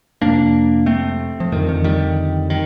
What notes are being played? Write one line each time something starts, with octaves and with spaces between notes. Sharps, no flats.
F2 C3 A#3 D4
A3 C4
F3
F2 D3 D#3
D#3
D#3 G3
D#3